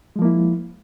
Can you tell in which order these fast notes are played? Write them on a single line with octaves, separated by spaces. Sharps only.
G#3 F3 A#3 E4